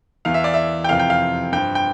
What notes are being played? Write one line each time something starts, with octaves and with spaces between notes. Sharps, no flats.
E2 E3 F5
E5
D5
E5
G5
F2 C3 E3 F5
G5
F5
G2 F3 G5
G5